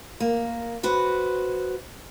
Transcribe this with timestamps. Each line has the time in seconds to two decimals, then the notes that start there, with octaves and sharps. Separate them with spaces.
0.20 A#3
0.83 F#4 B4 C5